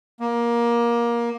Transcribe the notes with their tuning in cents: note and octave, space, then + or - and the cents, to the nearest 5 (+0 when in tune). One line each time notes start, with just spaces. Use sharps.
A#3 +20